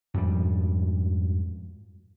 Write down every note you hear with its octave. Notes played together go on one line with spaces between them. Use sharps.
F2 G#2 F3 G3